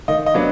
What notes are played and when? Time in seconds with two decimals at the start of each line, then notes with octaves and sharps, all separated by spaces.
0.08 D#3 D#5
0.26 D#5
0.34 F#3 B3 D4